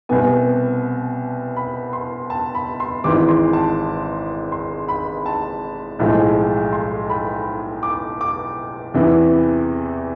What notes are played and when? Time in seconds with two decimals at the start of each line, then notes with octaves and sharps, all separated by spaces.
0.09 C2 B2 B3 G#5
1.56 B5
1.93 C6
2.30 A5
2.55 B5
2.80 C6
3.04 G#1 G#2 E3 D6
3.28 C6
3.53 A5
4.52 C6
4.88 B5
5.26 A5
5.99 B1 A2 F3 G#3
6.72 C6
7.10 B5
7.83 D6
8.21 D6
8.94 E2 C3 E3 B3